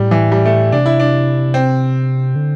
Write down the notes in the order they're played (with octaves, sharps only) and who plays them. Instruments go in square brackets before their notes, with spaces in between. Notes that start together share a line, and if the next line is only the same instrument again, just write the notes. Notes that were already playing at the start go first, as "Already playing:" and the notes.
Already playing: [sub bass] A2 [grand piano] G3
[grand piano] E3
G3
A3
[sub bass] C3 [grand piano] D4
[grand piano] E4
D4
C4
[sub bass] D3